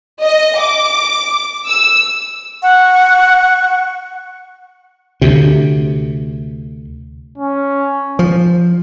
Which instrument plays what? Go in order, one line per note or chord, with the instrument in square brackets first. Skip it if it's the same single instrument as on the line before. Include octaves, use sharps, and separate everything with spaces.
[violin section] D#5
D6
E6
[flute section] F#5 C#6
[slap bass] D2 C3
[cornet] C#4
[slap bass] F3